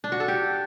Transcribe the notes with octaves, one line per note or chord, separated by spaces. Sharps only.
D4
F#4
A4
G4